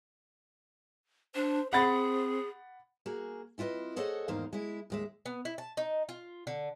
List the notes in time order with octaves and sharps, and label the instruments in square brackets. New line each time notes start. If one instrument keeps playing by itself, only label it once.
[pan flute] D4 [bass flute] C5
[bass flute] C4 [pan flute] G#4 [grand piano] F#5 B5 A6
[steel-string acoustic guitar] A#3 F#4 G#4
C4 E4 F4 B4 D#5
G#4 A4 C5 C#5 D#5 F#5
E2 G#2 D#3 A#3 D#4 C5
G#3 E4
D#2 G#3 E5
[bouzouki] B3
E4
A5
D#4
F4
D3